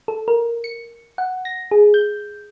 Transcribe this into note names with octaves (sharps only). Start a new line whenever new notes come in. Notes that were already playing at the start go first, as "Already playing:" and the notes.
A4
A#4
C#7
F#5
A#6
G#4
G6